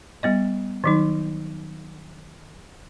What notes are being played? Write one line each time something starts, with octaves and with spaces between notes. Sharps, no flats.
G3 B3 D#5
D#3 F#3 D#4